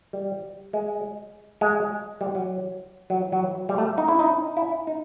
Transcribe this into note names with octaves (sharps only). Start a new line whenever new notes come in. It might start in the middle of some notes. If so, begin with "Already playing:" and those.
G3
G#3
G#3
G3
F#3
F#3
F#3
G3
A3
D#4
E4
D#4
E4
D#4